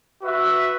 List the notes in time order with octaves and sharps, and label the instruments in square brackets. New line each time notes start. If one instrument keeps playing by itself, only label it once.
[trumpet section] F#4 B4 E5